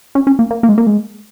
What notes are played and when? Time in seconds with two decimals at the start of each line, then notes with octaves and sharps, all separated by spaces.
0.15 C#4
0.27 C#4
0.39 A#3
0.51 A#3
0.63 A#3
0.69 G#3
0.78 A#3
0.87 G#3